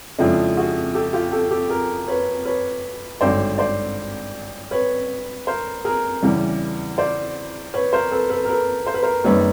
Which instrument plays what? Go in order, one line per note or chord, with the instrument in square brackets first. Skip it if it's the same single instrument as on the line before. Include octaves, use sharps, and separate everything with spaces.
[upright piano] F2 C#3 F3 G#3 D4 E4
F#4 G#4
G4 A4
F4 G4
G4 A4
G4 A4
G#4 A#4
B4 C#5
B4 C#5
G#1 G2 D3 F#3 C5 D5
C5 D5
B4 C#5
A#4 C5
G#4 A#4
E2 C#3 E3 G3
C5 D5
B4 C#5
A#4 C5
A4 B4
A4 B4
A#4
A4 B4
C5
B4
A#4 C5
F#1 F#2 D#3 G3 B4 C#5